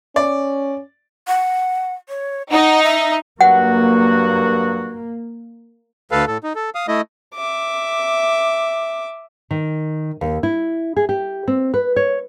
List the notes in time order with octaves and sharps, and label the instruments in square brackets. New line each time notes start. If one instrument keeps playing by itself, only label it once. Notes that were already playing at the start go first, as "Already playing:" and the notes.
[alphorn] C#4 [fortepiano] D5
[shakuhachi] F#5
C#5
[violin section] D#4 [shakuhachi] F#5
[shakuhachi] E5
[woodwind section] G2 F#3 F#4 [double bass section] A#3 [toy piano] F#5
[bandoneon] D2 A4 B4 F5
A2 A4
D#4
A4
F5 D#6
A3 E4 D#5
[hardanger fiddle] E5 D6
[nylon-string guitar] D#3
D#2
E4
G#4
G4
C4
B4
C#5